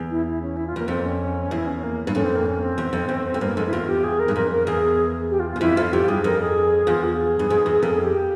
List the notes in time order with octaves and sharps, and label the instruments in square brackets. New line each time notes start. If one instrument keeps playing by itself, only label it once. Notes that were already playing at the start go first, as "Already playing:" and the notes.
Already playing: [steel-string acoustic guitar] E2
[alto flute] E4
E4
C#4
E4
F4
[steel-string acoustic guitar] E2 [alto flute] A#3
[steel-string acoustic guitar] F2 [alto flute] C4
[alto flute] C#4
[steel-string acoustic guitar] E2 [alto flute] E4
[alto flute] C#4
A#3
[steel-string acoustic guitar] G2
[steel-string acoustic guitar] F2 [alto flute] C#4
[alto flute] C4
A#3
C#4
C4
[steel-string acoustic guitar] E2
F2
E2
F2
[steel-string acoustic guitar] G2 [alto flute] A#3
[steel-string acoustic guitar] F2 [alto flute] G#3
[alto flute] E4
[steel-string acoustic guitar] E2 [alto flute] F4
[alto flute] G4
G#4
A#4
[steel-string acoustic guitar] G2
[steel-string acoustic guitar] F2 [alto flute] A#4
[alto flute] A#4
[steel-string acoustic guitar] E2 [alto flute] G#4
[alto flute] G4
F4
F4
[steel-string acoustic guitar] E2
[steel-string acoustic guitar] F2 [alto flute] E4
[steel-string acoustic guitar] F2 [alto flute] F4
[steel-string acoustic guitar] F2 [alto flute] G4
[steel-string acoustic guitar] G2 [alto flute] G#4
[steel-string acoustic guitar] F2 [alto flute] A#4
[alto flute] G#4
[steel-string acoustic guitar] E2 [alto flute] F4
[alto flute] G#4
[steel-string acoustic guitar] G2
F2
E2
[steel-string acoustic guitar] F2 [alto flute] A#4
[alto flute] G#4
G4